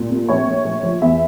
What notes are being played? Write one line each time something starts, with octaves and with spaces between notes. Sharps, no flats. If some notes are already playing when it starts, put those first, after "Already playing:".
Already playing: A#2
C2
A#1 C#5
A#1
A#1
F3
E2 E5